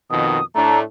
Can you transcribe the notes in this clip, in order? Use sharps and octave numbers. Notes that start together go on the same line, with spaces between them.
F2 B2 D#3 D#6
A2 A3 D4 A#5